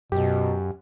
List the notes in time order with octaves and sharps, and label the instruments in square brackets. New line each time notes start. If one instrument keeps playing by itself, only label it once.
[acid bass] F#2 [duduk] B2 [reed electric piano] G4